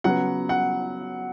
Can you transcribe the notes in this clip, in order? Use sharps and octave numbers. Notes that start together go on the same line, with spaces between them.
C#3 F#3 B3 F#5
F#5